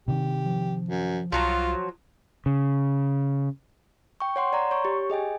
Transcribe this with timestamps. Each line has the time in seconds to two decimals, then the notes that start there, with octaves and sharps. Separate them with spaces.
0.08 C3 D#3 G4
0.46 F3
0.89 F#2
1.32 C2 F3 F#3 F4 A#5
2.46 C#3
4.20 G5 C#6
4.36 C#5 F#5 C6
4.53 D5 A#5 C6
4.71 C#5 C#6
4.85 G4
5.10 G#4 D#5 G5 G#5